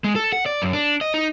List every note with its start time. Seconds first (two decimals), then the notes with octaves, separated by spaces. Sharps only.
0.04 G#3
0.16 A4
0.33 F#5
0.46 D5
0.62 F#2
0.73 D4
1.01 D#5
1.14 D#4